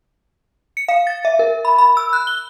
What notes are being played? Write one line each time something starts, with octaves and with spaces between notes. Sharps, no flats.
C#7
F5
A6
E5
A#4
B5
B5
E6
F#6
G7